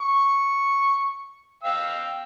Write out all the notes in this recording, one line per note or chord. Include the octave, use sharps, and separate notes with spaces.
C#6
F5 G5 E6